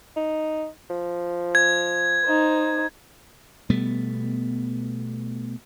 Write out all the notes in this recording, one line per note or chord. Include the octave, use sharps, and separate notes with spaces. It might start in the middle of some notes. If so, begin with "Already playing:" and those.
D#4
F3
G#6
D#4 C5
B2 G3 A3 B3